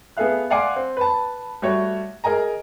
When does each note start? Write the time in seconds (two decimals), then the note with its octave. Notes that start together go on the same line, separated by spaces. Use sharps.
0.17 B3 G#4 A4 E5 F5 F#6
0.50 D5 F5 F#5 G#5 C6 D6
0.76 C4
0.97 B4 A5
1.62 G3 A3 F#4 C#5
2.24 G#4 A#4 D#5 G#5 A#5